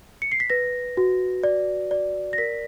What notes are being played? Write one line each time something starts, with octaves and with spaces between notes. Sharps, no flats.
C#7
C7
B6
B4 A#6
F#4
D5
D5
A#6
A#4 B6